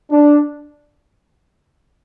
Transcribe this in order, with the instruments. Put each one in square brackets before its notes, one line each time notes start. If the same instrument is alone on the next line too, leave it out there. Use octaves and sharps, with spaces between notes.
[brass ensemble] D4